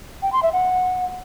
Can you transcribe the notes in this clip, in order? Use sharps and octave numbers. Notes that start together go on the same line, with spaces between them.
G5
C6
E5
F#5